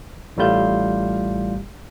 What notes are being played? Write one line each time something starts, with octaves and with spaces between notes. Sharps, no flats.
A1 A2 G3 A3 F4 G6